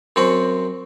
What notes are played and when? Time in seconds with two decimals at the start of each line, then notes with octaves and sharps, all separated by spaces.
0.16 F#2 C4 F#4